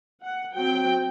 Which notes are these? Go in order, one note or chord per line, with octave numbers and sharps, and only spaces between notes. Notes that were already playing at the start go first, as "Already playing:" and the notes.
F#5
F#3 C4 G5